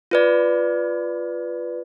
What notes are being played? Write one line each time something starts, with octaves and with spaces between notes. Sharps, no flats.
F4 B4 D5